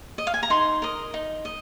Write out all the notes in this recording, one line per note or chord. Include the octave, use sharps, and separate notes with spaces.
D#5
F5
G#5
A#5
D#4 C6
A#4 D#5
D#4
D#5